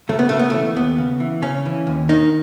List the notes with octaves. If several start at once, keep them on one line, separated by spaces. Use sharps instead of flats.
C#3 A3
B3
C#3 A3
B3
E3 A3
D#2 B3
C#3
E3
C#3 C#4
E3
D#2
D#3 D#4